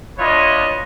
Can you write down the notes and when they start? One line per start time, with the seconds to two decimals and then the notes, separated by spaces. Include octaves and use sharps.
0.18 D4 E4 F4 B4 C#5 D#5